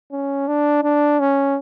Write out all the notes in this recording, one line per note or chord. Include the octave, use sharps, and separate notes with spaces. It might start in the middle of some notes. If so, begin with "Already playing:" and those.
C#4
D4
D4
C#4